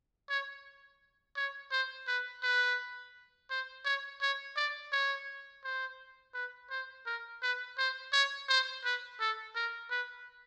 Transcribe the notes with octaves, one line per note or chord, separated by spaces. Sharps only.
C#5
C#5
C5
B4
B4
C5
C#5
C#5
D5
C#5
C5
B4
C5
A#4
B4
C5
C#5
C5
B4
A4
A#4
B4